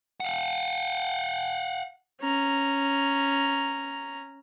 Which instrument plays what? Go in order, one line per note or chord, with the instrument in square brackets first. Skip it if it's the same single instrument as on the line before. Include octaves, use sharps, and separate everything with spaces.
[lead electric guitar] F5 F#5
[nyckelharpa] C#4 A#5